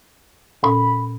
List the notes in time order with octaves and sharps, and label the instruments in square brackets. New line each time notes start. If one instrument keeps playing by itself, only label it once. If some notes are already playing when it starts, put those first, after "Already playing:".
[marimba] A#2 C#4 A4 [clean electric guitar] B5